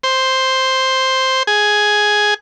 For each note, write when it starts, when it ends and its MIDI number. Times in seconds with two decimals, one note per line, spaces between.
0.03 1.43 72
1.47 2.34 68